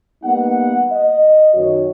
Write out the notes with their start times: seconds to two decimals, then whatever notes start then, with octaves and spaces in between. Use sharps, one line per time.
0.23 G3 A#3 B3 D#4 F#5
0.91 D#5
1.54 F#2 D#3 F#4 C#5